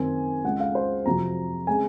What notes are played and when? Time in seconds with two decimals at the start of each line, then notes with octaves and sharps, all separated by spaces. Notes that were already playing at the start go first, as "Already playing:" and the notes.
Already playing: F#2 D#3 F#3 C4 G#5
0.44 C#2 C#3 G#3 F#5
0.60 F5
0.75 C5
1.06 F2 C3 F#3 A#5
1.67 C#3 G#3 C4 G#5